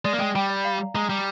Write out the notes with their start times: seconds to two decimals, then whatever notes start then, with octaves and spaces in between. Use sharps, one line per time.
0.05 G#3 D5
0.13 A#3
0.19 G#3 G5
0.36 G3 G5
0.50 D5
0.65 F5
0.80 A#5
0.95 G#3 A#5
1.09 G3 A#5